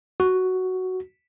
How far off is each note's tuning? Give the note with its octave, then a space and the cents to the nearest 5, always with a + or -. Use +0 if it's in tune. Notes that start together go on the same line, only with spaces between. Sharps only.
F#4 +5